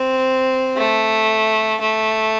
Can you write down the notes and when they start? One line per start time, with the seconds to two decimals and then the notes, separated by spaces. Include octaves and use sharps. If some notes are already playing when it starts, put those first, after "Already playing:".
Already playing: C4
0.76 A3
1.81 A3